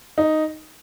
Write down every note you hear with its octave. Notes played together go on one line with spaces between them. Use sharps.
D#4